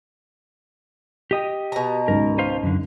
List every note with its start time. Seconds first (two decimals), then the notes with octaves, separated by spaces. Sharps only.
1.31 G4 D#5 G5
1.72 B2 A#5
2.08 G#1 C#2 G#2 A#4
2.38 B4 C5 F5
2.63 F#2 D3